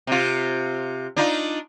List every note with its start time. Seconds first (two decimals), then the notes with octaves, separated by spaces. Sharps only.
0.07 C3 F4
1.17 D4 D#4 F4